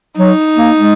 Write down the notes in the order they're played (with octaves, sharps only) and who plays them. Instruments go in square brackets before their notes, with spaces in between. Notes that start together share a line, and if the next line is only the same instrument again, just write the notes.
[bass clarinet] F#3 [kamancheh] D#4
[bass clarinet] A#3
G#3